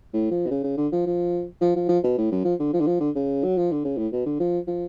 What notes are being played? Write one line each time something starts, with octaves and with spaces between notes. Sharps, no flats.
A2
F3
B2
C#3
C#3
D3
F3
F3
F3
F3
F3
B2
A2
F#2
F3
D3
F3
D3
F3
D3
C#3
F#3
F3
D3
C#3
A2
B2
D3
F3
F3